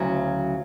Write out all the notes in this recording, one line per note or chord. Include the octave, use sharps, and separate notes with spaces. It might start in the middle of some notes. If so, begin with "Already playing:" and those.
Already playing: D2 C#3 F#3 E4